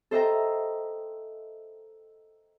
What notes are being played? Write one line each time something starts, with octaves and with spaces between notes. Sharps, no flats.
A4 C5 D#5 E5 G5 A#5